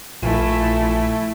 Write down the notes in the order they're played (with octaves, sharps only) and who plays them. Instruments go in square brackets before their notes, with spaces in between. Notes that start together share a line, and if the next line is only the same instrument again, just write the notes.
[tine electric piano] A#1 F4 G#5 [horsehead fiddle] A3 E4